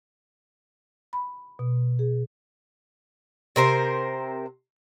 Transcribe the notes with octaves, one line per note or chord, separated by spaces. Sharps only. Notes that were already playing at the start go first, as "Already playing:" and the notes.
B5
B2
G#4
C3 A#4 C5